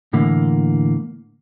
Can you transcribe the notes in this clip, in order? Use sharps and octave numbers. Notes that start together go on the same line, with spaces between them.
A2 D3 E3 A#3